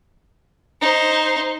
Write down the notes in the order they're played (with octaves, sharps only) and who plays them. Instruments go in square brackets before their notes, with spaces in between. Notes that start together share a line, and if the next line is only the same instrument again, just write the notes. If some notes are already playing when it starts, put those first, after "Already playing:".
[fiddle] D#4 C5